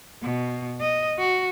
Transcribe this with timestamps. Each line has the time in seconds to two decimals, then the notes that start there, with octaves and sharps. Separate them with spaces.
0.22 B2
0.80 D#5
1.18 F#4